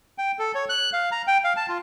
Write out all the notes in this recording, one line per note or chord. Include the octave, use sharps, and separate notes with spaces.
G5
A4
C#5
F#6
F5
A#5
G5
F5
A5
F4